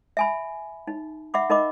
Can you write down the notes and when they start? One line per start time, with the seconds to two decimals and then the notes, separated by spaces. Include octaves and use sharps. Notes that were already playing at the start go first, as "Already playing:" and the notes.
0.17 E5 G#5 B5
0.87 D#4
1.34 E5 F#5 B5 D6
1.50 D#4 A#4 D#5 B5 D6